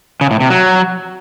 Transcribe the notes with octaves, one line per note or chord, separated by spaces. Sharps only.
C#3
A2
C3
F#3